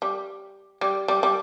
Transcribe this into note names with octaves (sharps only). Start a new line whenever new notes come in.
G3
G3
G3
G3